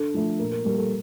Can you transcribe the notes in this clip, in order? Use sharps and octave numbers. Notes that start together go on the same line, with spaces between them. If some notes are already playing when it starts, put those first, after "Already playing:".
Already playing: D3 A4
F3 A3
A#2 A#4
A#4
G3 A#3 A#4
A4